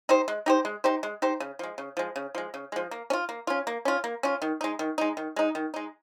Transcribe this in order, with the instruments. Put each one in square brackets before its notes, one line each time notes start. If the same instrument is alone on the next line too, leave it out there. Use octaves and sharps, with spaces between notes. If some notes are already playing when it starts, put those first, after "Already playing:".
[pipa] D#4 G4 C5
G#3
D#4 G4 C5
G#3
D#4 G4 C5
G#3
D#4 G4 C5
C#3
F3 G#3
C#3
F3 G#3
C#3
F3 G#3
C#3
F3 G#3
A#3
C#4
F4
A#3
C#4 F4
A#3
C#4 F4
A#3
C#4 F4
D#3
G#3 D#4
D#3
G#3 D#4
D#3
G#3 D#4
D#3
G#3 D#4